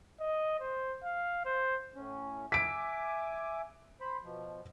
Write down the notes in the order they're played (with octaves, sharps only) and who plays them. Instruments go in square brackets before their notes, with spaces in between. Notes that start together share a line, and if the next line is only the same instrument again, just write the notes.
[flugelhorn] D#5
C5
F5
C5
[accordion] A2 C#4
[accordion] E5 G#5 D6 [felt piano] B6 D7
[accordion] C5 B5
B2 F3